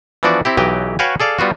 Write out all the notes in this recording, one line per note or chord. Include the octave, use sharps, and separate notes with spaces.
E3 F3 B3 D4 F#4 D5
C4 E4 G4
B1 E3 F#3 G4 D#5 G5
F#4 B4 C#5 F5 G5 G#5
G#4 A4 D5 F5
G3 B3 F4 F#4